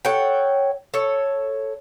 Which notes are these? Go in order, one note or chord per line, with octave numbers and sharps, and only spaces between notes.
A4 C#5 F#5 G5
A4 C#5